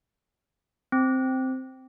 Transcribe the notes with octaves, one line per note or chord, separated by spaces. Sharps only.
C4